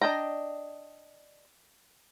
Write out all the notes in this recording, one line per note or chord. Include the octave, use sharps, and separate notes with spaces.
D4 D#5 G5 A#5